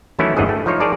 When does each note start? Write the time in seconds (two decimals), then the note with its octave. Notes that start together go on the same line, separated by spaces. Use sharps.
0.19 D#3 E3 F#3 A3 C#4 E4
0.37 G#1 E2 G2 E3 G#4 D#5
0.49 A3
0.66 F3 D#4 C5 C#5
0.80 G#4 A#4 C#5 D5 A5